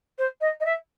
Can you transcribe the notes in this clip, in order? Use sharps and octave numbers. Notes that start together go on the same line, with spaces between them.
C5
D#5
D#5
E5